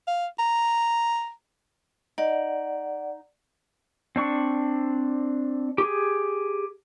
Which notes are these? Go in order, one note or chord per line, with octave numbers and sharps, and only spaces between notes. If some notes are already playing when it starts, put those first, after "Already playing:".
F5
A#5
D#4 D5 F#5
C4 D4 C#6
G4 G#4